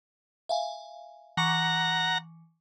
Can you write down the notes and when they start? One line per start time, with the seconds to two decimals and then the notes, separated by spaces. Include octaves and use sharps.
0.49 E5 F5 G#5
1.37 E3 F#5 A#5 C#6 C#7